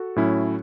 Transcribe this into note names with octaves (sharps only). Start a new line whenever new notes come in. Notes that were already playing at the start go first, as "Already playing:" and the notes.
Already playing: F#4 A4
A2 F#3 C#4 E4